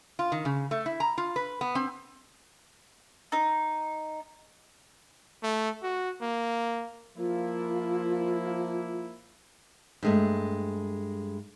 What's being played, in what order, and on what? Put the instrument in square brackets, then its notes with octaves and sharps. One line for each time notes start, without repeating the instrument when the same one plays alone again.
[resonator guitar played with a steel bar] F4
D#3
C#3
A3
E4
A#5
F4
B4
B3
C4
[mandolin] D#4
[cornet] A3
F#4
A#3
[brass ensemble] F3 A#3 E4 [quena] F4
[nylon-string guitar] G2 G#3 A3